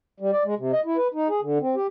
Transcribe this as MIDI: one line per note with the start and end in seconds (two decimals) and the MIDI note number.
0.20 0.31 55
0.33 0.43 74
0.45 0.55 56
0.59 0.72 48
0.72 0.80 75
0.85 0.97 64
0.97 1.08 71
1.14 1.28 63
1.29 1.40 68
1.42 1.58 50
1.61 1.75 60
1.76 1.87 67